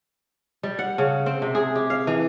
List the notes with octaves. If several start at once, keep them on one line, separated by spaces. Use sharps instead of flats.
G3
F#5
C#3
C4
C3
G#4
G4
F5
E3